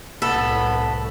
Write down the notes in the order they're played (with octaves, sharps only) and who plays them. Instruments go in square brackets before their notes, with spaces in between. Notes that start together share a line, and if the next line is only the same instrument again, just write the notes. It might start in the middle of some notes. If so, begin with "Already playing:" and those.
[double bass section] C2 A2 [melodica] B3 B5 [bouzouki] A4